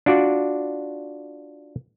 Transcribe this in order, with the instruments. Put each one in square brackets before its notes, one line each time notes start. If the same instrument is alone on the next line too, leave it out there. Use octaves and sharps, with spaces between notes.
[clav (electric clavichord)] D4 F4 F#4 D5